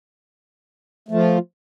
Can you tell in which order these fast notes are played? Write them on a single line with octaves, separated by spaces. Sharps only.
A3 F3 F4